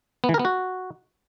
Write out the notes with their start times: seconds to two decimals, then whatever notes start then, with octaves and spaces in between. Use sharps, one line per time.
0.24 B3
0.29 E3
0.34 A#4
0.39 B3
0.45 F#4